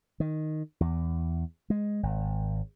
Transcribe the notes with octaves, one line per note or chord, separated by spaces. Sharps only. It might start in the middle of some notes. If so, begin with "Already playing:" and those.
D#3
E2
G#3
G#1